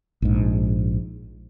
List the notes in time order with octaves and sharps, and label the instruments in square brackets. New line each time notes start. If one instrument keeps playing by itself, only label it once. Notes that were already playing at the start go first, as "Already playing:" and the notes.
[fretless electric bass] A#1 G#2